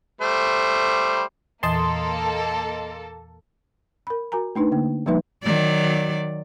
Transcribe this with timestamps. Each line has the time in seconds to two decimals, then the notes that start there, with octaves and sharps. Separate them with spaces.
0.21 G3 A3 C5
1.63 E2 A#2 E3 A#3 A4 D#5 A5 C6
4.07 A#4 B5
4.32 F#4 A#4 G#5 A#5
4.55 A3 D4 D#4 B4
4.72 D3 A#3
5.06 F3 G3 A#3 D#4 B4 E5
5.43 D#3 F#3 D5